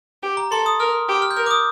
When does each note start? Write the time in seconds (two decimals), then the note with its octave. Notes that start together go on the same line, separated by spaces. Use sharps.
0.23 G4
0.37 A#5
0.51 A4 C6
0.66 D#6
0.79 A#4 F6
1.09 G4
1.22 F6
1.31 G6
1.36 A#4 F6
1.46 D6
1.51 D#6